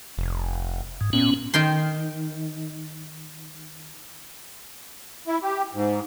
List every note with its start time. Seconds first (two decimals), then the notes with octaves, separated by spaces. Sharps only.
0.18 F1
1.01 G#2
1.13 A#2 B3 C#4
1.54 D#3 G5 C6
5.27 E4
5.43 G4
5.74 G#2